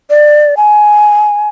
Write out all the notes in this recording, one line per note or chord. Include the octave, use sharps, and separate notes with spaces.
D5
G#5